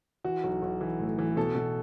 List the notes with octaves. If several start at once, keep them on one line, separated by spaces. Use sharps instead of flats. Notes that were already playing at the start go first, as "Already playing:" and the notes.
E3 F#4
B1
B1
E3
A2
E3
B2 A4
B2